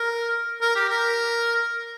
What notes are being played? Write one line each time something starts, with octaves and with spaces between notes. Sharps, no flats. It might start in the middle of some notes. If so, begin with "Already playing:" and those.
Already playing: A#4
A#4
G4
A#4